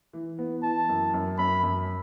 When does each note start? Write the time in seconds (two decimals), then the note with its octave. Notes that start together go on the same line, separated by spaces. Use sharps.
0.13 E3
0.38 B3
0.63 E3 A5
0.89 F#2
1.14 F#2
1.38 F#2 B5
1.63 F#2